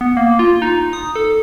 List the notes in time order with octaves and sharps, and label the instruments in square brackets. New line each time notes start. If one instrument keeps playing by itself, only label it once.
[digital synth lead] B3
A#3
F4
D#4
D#6
A4